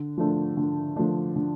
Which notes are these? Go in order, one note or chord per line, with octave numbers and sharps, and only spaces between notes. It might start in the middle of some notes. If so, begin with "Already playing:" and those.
Already playing: D3
F3 A3 D4
D3
F3 A3 D4
D3